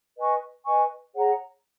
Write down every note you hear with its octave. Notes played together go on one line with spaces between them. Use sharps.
B4 D#5 G#5 C#6
B4 D#5 G#5 C#6
G#4 C#5 F#5 A#5